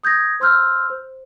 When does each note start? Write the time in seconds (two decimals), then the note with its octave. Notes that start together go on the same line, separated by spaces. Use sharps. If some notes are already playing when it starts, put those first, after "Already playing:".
0.04 D#6 G6 G#6 A#6
0.40 C5 C6 E6 F6 G6
0.90 C5